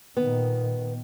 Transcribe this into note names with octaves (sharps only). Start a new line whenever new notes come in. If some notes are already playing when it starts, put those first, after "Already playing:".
A#2 D#3 B3